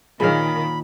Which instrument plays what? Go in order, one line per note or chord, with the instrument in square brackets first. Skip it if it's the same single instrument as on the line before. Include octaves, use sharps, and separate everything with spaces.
[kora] A#2 F5 [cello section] D#3 [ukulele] G#4 C#5 [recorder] B5